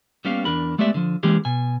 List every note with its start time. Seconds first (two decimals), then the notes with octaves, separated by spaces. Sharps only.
0.25 G3 A#3 B3 C#4 G4 F5
0.45 E2 D4 A#4 B5
0.78 G#3 A3 B3 G4 D5 E5
0.94 D3 F3
1.23 E3 G#3 A#3 C#4 G4 G#4
1.45 B2 G#5